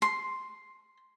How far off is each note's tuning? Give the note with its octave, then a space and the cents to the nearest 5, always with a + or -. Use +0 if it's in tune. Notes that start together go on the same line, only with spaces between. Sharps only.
C6 +0